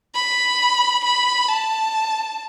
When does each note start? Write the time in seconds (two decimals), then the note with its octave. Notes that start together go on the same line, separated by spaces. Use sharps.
0.15 B5
1.04 B5
1.48 A5